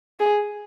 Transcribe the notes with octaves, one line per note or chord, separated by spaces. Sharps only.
G#4